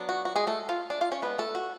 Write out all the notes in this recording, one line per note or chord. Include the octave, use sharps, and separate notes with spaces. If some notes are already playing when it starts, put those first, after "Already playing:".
Already playing: F#3 B3 D4
F#4
F#4
G#3 G#4
A3 A4
F4 F5
D4 D5
F4 F5
C#4 C#5
G#3 B3 D4 B4
A3 A4
F#4